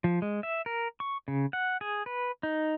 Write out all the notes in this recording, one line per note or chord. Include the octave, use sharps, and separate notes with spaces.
F3
G#3
E5
A#4
C#6
C#3
F#5
G#4
B4
D#4